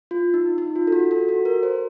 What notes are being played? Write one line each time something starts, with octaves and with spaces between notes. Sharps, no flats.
F4
D#4
D#4
F4
A4
F#4
A4
F#4
A#4
C5